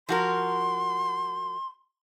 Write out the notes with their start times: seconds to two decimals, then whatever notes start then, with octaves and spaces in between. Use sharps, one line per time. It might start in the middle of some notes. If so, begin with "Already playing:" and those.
0.09 F3 F#4 A#4 C6